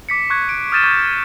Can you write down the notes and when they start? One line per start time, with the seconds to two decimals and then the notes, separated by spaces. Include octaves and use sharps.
0.09 D6 B6 C#7
0.30 C#6 F#6 G#6
0.49 D7
0.72 D#6 F6 G6 A6 D#7 E7
0.83 C#6 D6 G6